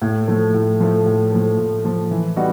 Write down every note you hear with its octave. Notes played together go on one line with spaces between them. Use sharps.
A2
F3 A3
A2
F3 A3
A2
F3 A3
A2
F3 A3
E3
G3 B3 D#4 F#4